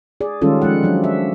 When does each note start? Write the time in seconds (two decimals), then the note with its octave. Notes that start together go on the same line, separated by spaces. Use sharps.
0.21 G#4 D5
0.42 D#3 G3 G#3 C#4 F4 A4
0.62 F3 G#3 F#5
0.83 F3 F#3 D4
1.04 E5